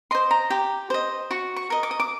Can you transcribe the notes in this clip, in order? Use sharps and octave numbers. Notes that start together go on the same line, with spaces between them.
C5 D#5 C6
A#5
G4
C5 D#5
F#4 C#6
C#6
A#4 D#5
D6
D#6
D6